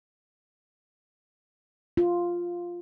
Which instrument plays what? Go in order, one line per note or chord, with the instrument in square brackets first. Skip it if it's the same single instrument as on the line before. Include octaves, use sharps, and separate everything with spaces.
[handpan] F4